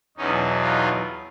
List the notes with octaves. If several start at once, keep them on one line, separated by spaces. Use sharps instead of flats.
E2 B2 F#3 C#4 D#4
D#4 F4